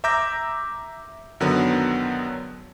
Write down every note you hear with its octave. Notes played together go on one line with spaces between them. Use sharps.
E5 A#5 D6 E6 G6 A#6
F#2 D3 D#3 F#3 B3